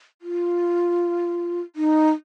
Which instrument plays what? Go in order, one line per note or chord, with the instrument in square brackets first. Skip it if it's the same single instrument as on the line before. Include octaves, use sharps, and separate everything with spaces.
[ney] F4
D#4